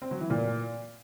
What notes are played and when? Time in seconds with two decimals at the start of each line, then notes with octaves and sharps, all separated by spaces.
0.02 C4
0.11 F#3
0.21 E3
0.30 A#2